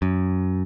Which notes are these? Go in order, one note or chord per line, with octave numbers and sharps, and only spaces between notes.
F#2